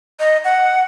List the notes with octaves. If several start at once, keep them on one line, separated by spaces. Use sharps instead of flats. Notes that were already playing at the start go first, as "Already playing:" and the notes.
D#5
F#5